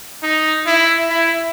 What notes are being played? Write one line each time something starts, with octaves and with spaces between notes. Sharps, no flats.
D#4
E4
E4